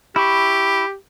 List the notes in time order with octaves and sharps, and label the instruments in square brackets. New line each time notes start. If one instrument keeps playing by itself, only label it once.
[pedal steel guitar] E4 B5 C#6 [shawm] G4